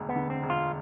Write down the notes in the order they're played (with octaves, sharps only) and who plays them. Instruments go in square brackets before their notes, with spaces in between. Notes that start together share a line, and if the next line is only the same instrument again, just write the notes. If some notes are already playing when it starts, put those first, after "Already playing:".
Already playing: [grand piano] E1 D2 D3
[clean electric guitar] B3
[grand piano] D3
[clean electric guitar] C4
[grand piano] E1
[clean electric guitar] F4